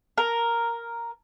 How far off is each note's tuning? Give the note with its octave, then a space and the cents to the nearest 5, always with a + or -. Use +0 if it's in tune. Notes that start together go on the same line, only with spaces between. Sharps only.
A#4 +0